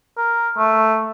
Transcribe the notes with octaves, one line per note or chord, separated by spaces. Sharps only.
A#4
A3